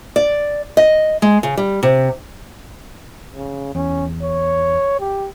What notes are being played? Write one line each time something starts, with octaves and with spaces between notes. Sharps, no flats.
D5
D#5
G#3
C#3
G3
C3
C#3
E2 C#4
C#5
G4